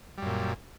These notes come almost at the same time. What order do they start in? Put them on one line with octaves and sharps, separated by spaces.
G3 F#2 A#2